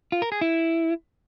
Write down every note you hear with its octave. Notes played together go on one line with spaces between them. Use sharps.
F4
A#4
G#4
E4